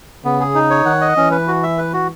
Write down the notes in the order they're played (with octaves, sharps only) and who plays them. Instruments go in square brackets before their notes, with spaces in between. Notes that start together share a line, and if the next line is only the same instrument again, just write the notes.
[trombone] C#3 [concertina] B3
[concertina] G#4
D#4
C#5
[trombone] D#3 [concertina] F#5
[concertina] D#5
[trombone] E3 [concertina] C#4
[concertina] B4
F#4
E5
B4
F#4